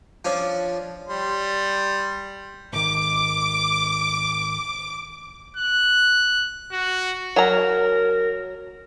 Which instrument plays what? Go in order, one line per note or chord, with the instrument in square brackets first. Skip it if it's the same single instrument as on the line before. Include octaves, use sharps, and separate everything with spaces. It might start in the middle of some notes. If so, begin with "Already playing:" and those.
[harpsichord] F3 C#4 D4
[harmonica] G3 C6
[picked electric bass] G#1 D#3 [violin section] D6
[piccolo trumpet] F#6
F#4
[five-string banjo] F#3 A#5 [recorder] A#4